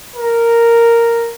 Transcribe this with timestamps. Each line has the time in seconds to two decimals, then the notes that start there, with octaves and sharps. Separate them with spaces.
0.16 A#4